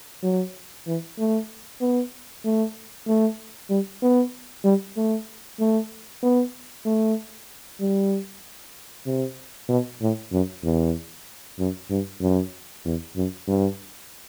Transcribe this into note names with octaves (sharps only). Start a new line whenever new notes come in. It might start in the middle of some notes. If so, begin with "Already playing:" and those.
F#3
E3
A3
B3
A3
A3
G3
B3
G3
A3
A3
B3
A3
G3
C3
B2
A2
F#2
E2
F#2
G2
F#2
E2
F#2
G2